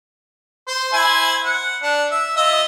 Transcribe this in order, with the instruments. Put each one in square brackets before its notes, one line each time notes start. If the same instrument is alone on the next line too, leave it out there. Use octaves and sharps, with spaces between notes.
[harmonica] C5
E4 C5 G#5
F#5
D4
E5
F4 D#5 E5